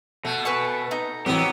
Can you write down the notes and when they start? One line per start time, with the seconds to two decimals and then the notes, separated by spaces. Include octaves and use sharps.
0.25 B2 A3
0.45 B4 G#5 C#6
0.91 D#4 A#5
1.26 E3 F#3 B3 C4 G4